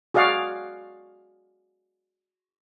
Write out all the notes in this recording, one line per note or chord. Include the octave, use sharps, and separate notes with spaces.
F#4 G#4 D5 F5 F#5